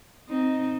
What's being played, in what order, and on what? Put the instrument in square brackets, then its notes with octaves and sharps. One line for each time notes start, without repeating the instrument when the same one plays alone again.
[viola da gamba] C4 D#4